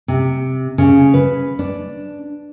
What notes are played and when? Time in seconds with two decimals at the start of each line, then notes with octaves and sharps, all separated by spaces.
0.08 C3
0.78 C#3
1.14 B4
1.59 D4